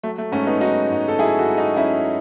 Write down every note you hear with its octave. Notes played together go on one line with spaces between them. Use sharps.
F#3 A3
A3
G#2 A3 C#4
B3 D#4
F#3 D#4 F#4
G#2
A4
F#3 E4 G#4
F#4 A4
G#2
D#4 F#4
F#3 C#4 E4